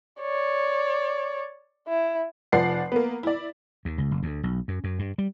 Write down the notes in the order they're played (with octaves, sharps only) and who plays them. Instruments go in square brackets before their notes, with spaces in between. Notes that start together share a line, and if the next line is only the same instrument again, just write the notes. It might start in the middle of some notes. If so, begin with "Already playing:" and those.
[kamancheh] C#5 D5
E4
[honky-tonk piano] F1 F3 D5 F#5 C7
A#3 B3
E4 D5
[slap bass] D#2
C#2
F#1
D2
B1
F#2
F#2
G2
G3